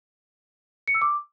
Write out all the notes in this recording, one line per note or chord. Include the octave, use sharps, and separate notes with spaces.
C#7
E6
D6